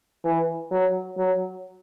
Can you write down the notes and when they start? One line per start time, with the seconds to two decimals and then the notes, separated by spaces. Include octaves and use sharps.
0.24 E3
0.71 F#3
1.17 F#3